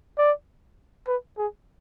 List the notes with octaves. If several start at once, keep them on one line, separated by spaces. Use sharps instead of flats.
D5
B4
G#4